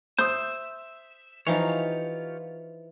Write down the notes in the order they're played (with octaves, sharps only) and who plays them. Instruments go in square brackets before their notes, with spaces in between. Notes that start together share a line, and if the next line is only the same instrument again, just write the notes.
[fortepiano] C5 D#6 [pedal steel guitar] E5 [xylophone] G6
[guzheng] E3 F3 D#4 [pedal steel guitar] F4 G4 C#5